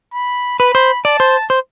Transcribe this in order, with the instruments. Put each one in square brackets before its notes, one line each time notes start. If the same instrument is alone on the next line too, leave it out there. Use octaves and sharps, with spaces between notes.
[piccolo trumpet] B5
[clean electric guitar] B4 [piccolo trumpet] B5
[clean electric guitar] C5
[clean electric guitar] D5 [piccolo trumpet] A5
[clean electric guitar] C5
C5